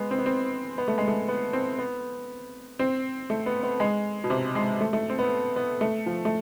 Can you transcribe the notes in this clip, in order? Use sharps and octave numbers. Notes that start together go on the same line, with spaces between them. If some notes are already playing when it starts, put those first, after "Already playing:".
Already playing: G#3 B3
C4
B3
C4
B3
A3
G#3
A3
B3
C4
B3
C4
A3
B3
B3
G#3
B2
C3
G#3
A3
A3
C4
B3
B3
A3
F3
A3